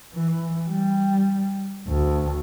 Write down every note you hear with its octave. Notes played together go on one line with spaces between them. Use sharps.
E3
G3
D2